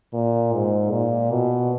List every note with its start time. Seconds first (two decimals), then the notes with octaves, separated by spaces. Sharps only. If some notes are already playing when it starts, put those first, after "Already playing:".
0.13 A#2
0.53 G#2
0.91 A#2
1.31 B2